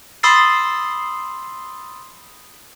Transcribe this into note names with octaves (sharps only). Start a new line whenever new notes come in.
B5 C6 D#6 E6 A6 C7